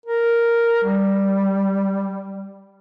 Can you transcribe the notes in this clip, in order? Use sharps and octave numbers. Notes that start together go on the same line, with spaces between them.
A#4
G3